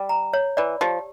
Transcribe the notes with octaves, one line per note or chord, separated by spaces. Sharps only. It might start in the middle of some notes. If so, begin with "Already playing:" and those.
Already playing: G3
A#5
C#5
E3 D5
F3 G4